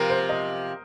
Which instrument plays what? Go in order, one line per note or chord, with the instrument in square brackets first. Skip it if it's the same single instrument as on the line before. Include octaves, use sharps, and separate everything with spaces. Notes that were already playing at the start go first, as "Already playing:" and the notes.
Already playing: [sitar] C3 F3 [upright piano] A#4
[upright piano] C5
D#5